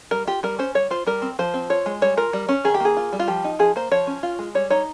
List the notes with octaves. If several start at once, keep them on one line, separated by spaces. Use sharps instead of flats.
G3 A#4
F4 G4
G3 A#4
C#4 C5
G3 C#5
F4 C5
G3 A#4
C4
F3 C5
C4
F4 C#5
G#3
G3 C#5
F4 A#4
G3
C#4
D#3 G#4
G4
A#3 G#4
F4
G3
F4
F3 G4
D#4
F3 G#4
A#3 C5
F3 C#5
C#4
F4
G#3
G3 C#5
D#4 C#5